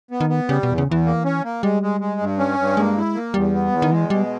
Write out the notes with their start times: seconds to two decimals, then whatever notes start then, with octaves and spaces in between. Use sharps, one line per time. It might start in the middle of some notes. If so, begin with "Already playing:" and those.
0.11 B3
0.20 D#3
0.29 B3
0.49 C#3 G3
0.63 B2
0.68 E2
0.78 C#3
0.87 E2 E3
1.06 A#3
1.25 C#4
1.44 A#3
1.63 G3 G#3
1.83 G#3
2.01 G#3
2.21 G2
2.39 C#4
2.59 G2
2.77 G#3 A#3
2.97 E4
3.15 A#3
3.34 E2 G3
3.54 B3
3.72 E2
3.82 D#3
3.92 E3 G#3
4.10 B2 G3